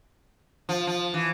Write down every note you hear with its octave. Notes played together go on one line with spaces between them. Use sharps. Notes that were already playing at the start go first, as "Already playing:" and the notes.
F3
F3
E3